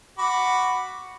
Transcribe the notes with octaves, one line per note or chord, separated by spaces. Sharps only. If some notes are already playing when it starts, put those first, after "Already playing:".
F#4 B5 D6